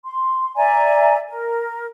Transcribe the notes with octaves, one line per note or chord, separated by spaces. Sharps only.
C6
D5 E5 G#5 A#5
A#4